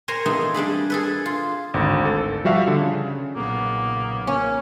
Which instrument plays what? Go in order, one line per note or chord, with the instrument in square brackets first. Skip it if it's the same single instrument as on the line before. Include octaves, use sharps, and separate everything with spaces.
[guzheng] A#4 C5 C#5 G#5 A#5
A3 B3 C4 D#4 F4 G#4
G3 D4 G#4 B5
G#4 A4 B4
F4
[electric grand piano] G#1 D2
A4
F3 G3 F#4 E5 F5
D3
C#3
[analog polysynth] B1 C#3 B3 [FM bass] A#2 [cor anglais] A#3
[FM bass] A#3 [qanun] C#4